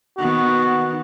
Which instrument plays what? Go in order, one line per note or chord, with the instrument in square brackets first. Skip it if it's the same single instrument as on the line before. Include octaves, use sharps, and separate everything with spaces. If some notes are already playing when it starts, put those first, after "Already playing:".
[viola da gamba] D#3 B3 [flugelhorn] F#4